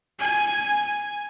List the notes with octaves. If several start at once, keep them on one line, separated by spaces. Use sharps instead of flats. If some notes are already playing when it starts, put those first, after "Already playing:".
G#5